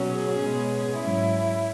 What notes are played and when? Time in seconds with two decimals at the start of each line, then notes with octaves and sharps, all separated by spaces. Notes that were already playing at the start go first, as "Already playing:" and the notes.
Already playing: B2 F#3 C#4
0.10 G#4
0.39 B2 G#3 C#4
0.97 G#2 F#3 C#4 E4